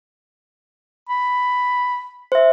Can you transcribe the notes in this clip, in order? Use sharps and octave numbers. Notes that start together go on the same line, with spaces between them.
B5
C5 E5